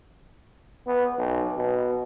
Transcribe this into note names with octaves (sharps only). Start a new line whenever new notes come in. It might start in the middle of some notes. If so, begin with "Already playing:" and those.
B3
B1
B2